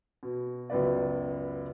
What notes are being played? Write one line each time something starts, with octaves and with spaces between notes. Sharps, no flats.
B2
C#2 F#2 B3 B4 D5